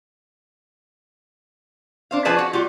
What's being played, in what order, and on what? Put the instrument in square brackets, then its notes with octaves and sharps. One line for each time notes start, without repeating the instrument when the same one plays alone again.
[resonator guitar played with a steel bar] D4 C5 F5
F3 G#4 B4 D5 G#5 A5
F#4
G3 F4 F#4